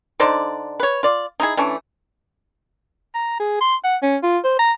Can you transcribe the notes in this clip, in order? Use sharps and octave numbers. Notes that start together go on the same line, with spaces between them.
D3 D#4 C5 D5
B4 C#5
F4 D5
D#4 E4 G#4
E3 A3 C#4 D4
A#5
G#4
C6
F#5
C#4
F4
C5
A#5